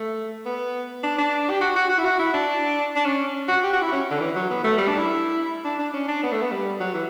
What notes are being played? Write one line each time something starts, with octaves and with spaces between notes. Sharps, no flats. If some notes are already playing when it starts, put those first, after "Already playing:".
Already playing: A3
B3
D4
D4
G4
F#4
F#4
F#4
E4
F#4
E4
D4
D4
C#4
F#4
G4
F#4
E4
C#4
D3
E3
F#3
B3
A3
G3
D4
E4
D4
D4
C#4
D4
B3
A3
B3
G3
F#3
E3